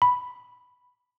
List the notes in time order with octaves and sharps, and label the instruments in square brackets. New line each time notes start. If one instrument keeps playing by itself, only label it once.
[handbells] B5